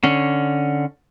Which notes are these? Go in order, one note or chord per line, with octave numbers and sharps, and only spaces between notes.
D3 C#4